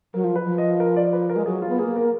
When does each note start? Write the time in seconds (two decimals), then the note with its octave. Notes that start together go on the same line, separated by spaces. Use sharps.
0.14 F#3 A#4
0.24 F3
0.36 B4
0.45 F3
0.58 D#5
0.80 A#4
0.96 D5
1.13 B4
1.29 A#4
1.36 G#3
1.46 F#3 G#4
1.62 F4
1.69 B3
1.79 A#3 G#4
1.96 A#4